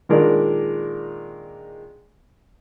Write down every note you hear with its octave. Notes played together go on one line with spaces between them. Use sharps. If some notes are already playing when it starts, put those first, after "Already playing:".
A#2 D#3 G#3 D4 A#4 D5